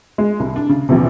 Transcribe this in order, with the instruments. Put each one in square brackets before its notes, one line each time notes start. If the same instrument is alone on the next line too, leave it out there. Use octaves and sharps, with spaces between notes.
[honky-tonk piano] G#3
C2
D4
C#3
A#1 E2 C3